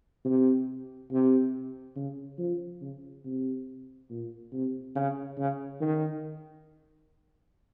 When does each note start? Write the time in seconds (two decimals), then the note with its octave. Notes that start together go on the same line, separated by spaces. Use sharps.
0.25 C3
1.11 C3
1.96 C#3
2.38 F3
2.81 C#3
3.25 C3
4.10 A#2
4.53 C3
4.95 C#3
5.38 C#3
5.81 D#3